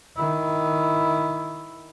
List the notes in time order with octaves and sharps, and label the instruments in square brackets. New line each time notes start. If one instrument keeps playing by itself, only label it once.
[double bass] D#3 E4